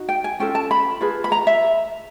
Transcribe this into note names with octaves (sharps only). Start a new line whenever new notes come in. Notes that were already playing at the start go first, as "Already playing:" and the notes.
Already playing: D#4 F#4
G5
G#5
C#4 F4 A4 G5
A5
B5
F4 G#4 B4
B5
A#5
E5